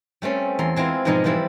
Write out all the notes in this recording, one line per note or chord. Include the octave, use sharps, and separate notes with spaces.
G3 A3 C4 C#4
E2 A4 A#5 C6
G#3 C4 E4 F4
G#2 B2 F3 G#3 D#4 G#5
E3 F3 G3 C4 E4